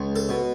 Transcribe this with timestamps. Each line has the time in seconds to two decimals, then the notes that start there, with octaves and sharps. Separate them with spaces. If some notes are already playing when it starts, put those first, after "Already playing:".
Already playing: C#2
0.16 A4
0.29 B2